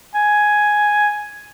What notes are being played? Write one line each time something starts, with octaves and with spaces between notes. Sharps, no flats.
G#5